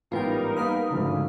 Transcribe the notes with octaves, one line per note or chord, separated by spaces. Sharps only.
A1 G#2 G3 B3 D#4 F4 A#4 G5
A#3 B3 F5 B5 D#6
D2 G#2 C#3 F3